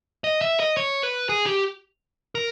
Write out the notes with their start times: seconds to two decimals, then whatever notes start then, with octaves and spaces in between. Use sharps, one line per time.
0.24 D#5
0.41 E5
0.60 D#5
0.77 C#5
1.03 B4
1.29 G#4
1.46 G4
2.35 A#4